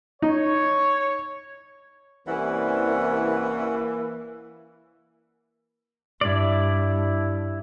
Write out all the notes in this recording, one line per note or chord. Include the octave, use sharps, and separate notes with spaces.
D#4 C#5
C2 E3 A#3 C#4 F#5
G2 E4 D5